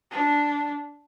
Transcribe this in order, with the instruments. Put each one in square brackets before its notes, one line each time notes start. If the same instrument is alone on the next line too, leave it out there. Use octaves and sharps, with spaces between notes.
[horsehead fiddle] D4